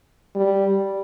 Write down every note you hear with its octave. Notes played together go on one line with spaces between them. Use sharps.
G3